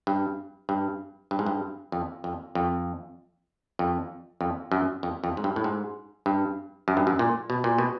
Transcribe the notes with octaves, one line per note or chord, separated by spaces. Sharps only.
G2
G2
G2
G#2
G2
F2
F2
F2
F2
F2
F#2
F2
F2
G#2
G2
A2
G#2
G2
F#2
G2
F#2
A#2
B2
A#2
B2